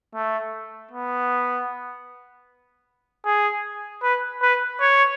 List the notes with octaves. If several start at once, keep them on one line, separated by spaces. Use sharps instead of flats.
A3
B3
G#4
B4
B4
C#5